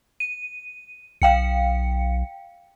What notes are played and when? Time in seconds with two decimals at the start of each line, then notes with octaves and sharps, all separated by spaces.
0.20 D#7
1.22 B1 F5 G5 C#7